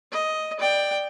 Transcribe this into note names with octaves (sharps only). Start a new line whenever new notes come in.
D#5
D5 G5